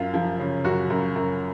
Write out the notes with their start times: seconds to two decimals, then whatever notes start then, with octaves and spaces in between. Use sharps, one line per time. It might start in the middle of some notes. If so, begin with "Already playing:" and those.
Already playing: F#2 F4
0.14 F3
0.39 C#3
0.64 F#2 F#4
0.90 F#2
1.15 F#2